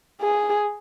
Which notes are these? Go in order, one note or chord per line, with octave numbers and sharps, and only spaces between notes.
G#4